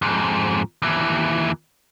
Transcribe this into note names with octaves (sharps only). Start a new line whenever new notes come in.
F2 G#2
D#2 E3